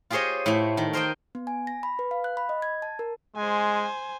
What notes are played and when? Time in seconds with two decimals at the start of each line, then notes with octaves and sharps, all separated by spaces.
0.10 F4 G4 G#4 C5 C#5 D#5
0.46 A2 A3
0.77 D#3
0.93 A#4 C5 D#5 G5
1.35 B3
1.47 G#5
1.67 A#6
1.83 B5
1.99 B4
2.11 F5
2.24 F#6
2.37 B5
2.49 D#5
2.62 G#6
2.82 A5
2.99 A#4
3.36 G#3 C5 G#5